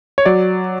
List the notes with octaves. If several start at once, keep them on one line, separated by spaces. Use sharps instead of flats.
C#5
F#3 D5